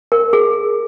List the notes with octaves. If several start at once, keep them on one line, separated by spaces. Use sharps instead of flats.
A#4
G#4